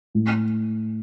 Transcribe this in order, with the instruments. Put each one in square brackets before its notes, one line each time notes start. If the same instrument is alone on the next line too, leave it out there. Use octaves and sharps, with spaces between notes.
[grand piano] A2